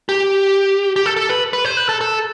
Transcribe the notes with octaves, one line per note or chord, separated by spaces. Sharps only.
G4
G4
A4
A4
B4
B4
C5
B4
A4
A4